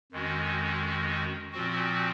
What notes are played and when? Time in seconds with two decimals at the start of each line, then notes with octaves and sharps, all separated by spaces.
0.12 F2 D#3 G#3 C#4 F#4
1.53 A#2 F3 C4 F#4